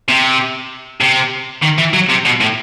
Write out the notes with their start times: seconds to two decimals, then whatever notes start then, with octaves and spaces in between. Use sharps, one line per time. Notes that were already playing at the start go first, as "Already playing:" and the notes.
0.08 C3
1.01 C3
1.62 D#3
1.78 E3
1.93 F#3
2.09 C3
2.25 B2
2.41 A2